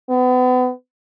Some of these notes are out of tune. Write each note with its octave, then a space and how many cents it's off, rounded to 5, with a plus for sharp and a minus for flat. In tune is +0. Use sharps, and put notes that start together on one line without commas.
B3 +35